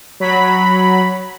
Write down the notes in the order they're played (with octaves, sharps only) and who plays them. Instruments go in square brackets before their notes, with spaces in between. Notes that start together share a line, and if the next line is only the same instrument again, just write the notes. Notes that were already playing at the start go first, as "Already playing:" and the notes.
[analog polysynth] F#3 B5